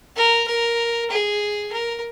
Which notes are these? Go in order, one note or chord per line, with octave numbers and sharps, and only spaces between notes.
A#4
A#4
G#4
A#4